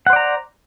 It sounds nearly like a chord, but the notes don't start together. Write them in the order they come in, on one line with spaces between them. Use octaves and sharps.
F#5 C5 D5 A#5